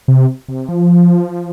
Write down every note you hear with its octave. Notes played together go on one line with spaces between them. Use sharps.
C3
C3
F3